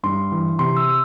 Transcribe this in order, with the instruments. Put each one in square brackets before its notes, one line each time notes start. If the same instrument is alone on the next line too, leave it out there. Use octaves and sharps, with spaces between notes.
[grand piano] G2 [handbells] C6
[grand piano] E3
[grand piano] C3 [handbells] C6
[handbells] E6